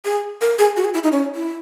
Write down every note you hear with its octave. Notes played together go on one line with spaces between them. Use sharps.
G#4
A#4
G#4
F#4
G#4
E4
D#4
C#4
E4